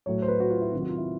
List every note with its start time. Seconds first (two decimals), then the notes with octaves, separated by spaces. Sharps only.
0.06 A2 F#3 C#5
0.22 C5
0.28 B4
0.40 F#4
0.50 F4
0.61 E4
0.72 C3 D#3 F#3 F4
0.81 F#4
0.89 F4
0.98 E4